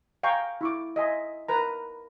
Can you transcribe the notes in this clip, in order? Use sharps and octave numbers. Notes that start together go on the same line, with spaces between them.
F5 G5 G#5 A#5 C#6
E4 C#6 D6
D#5 E5 G#5 C6
A#4 B4 A#5